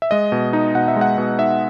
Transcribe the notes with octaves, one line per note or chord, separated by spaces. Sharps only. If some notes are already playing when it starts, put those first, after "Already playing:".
E5
G#3 D#5
B2
D#4
B2 F#5
E5
G#3 F#5
B2
D#4 E5